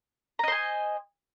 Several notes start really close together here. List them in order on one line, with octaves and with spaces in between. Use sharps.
A#5 D#5 C5 G#5